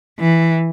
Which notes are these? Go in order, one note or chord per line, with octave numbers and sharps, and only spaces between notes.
E3